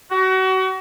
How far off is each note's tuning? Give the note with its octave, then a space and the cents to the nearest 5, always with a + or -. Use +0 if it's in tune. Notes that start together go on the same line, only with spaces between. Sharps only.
F#4 +30